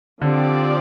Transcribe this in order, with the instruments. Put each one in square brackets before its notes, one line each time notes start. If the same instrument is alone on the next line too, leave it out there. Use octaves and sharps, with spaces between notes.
[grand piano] D3 [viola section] F3 C4 G4 D5